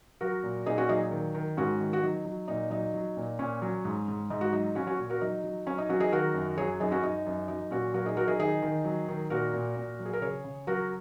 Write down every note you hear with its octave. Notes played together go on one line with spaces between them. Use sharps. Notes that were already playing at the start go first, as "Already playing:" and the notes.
F#3 F#4 A#4
A#2
A#2 D#4 G#4
C#4 F#4
F#3 D#4 G#4
D#3
D#3
G#2 C#4 F#4
D#3
F#4
F#3 D#4
F#3
A#2 D#4
F#3 D#4
F#3
A#2
A#2 C#4
F#3
G#2
G#2
G#2 D#4
F#4
F#3 D#4
F#3 C#4 F#4
C#4 F#4
A#2
F#4 A#4
F#3 D#4
F#3
F#3 C#4
D#4
F#3 C#4 F#4
D#4 G#4
D#3 F#4 A#4
F#2
F#3 G#4 C#5
F#2 D#4 G#4
C#4 F#4
F#2 D#4
F#2
F#3 D#4
A#2 C#4 F#4
F#3 F#4 A#4
D#4 G#4
F#3 F#4 A#4
D#4 G#4
D#3 D#4 G#4
D#3
F#3
D#3
A#2 F#4 A#4
A#2
A#2
F#3
G#4
A#4
C#3 G#4 C#5
C#3
F#3 F#4 A#4